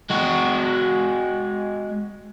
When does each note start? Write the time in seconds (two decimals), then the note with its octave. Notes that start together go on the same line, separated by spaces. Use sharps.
0.10 G#3 F#4